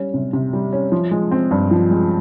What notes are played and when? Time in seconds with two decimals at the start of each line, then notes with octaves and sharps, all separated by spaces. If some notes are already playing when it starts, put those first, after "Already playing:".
Already playing: G3 C#4
0.14 C3
0.33 C3
0.53 G3
0.73 C#4
0.92 F3
1.11 G#3
1.31 C4
1.51 G2
1.71 F3
1.90 G#3